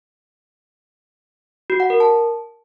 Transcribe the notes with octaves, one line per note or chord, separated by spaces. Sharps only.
F#4
F#5
A#4
A5